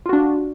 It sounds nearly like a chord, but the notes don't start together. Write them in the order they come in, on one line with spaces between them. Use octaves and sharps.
F4 F#4 D4